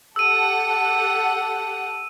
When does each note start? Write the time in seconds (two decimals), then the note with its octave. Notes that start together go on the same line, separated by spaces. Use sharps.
0.16 G4 A4 F#5 E6 D#7